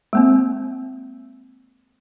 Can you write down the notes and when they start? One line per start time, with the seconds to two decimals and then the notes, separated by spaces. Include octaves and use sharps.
0.13 G#3 A#3 C4